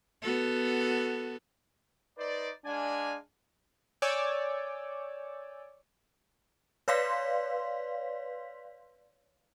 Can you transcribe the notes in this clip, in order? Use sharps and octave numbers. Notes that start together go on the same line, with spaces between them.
B3 F#4 A4
D#4 B4 C5 D5
G#3 D4 D5 F5 G#5
C#5 D5 G#5 D6 E6 G6
B4 C#5 D5 F5 C6 B6